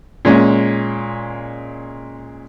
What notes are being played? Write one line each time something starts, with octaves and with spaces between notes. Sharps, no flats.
A#2 G#3 C#4